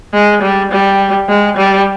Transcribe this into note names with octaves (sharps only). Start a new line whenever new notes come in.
G#3
G3
G3
G#3
G3